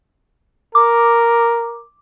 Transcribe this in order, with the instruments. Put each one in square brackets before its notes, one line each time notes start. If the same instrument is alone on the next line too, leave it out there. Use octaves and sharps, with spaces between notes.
[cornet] A#4 [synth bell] D6